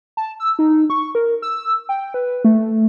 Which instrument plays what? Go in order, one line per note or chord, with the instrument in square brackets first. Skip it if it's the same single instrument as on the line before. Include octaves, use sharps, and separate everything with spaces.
[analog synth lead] A5
E6
D#4
C#6
A#4
E6
G5
B4
A3